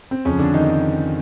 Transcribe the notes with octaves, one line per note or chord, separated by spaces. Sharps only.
C4
F2 C#3 F3 C#4
D3 D4
D#3 D#4